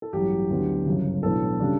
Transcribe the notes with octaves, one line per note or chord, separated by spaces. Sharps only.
A4
A1 G2 F#3 G4
D2 D3 F#3 B3 D4
G1 F#2 C#3
B1 A2 E3 B3 D4 A4
C#3 G3 D4